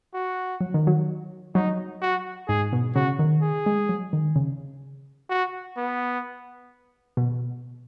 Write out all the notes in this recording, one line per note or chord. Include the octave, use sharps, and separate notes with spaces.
F#4
F#3
D#3
F#3
F#3 D#4
F#4
G#2 G#4
B2
C#3 F#4
D#3
G#4
G#3
F#3
D#3
C#3
F#4
B3
B2